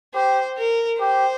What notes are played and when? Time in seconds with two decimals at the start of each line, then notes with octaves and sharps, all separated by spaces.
0.14 G4 C5
0.57 A#4
1.00 G4 C5